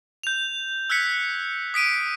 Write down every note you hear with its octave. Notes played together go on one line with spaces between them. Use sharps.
G6 F7
E6 F#6 G#6 B6 C#7
D#6 B6 D7 D#7